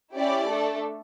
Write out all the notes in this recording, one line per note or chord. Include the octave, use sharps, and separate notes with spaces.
C#4 E4 G4 D5
A3 D4 A4